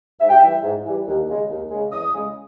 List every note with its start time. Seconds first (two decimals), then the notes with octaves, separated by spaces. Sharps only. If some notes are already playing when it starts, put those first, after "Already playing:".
0.20 G#2 E5
0.29 G5
0.38 E3 G3 E5
0.63 G#2
0.84 E3 G3
1.06 D#2
1.27 C#3 G#3
1.49 D#2
1.70 C#3 G#3
1.92 E2 D#6
2.14 C#3 G#3